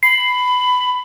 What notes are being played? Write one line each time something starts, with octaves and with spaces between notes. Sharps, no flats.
B5 C7